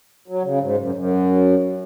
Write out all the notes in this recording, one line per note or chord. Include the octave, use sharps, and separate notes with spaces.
F#3
C#3
G#2
F#2
F#2